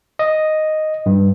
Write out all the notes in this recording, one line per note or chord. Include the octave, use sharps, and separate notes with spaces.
D#5
G2